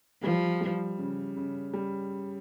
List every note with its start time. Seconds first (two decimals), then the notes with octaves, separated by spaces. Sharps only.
0.23 F3 G3
0.61 G3
0.99 C#3
1.37 C#3
1.74 G3